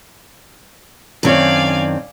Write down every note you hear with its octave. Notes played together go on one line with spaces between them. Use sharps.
F#2 D#3 C4 D4 C#5 D5 F5 G#5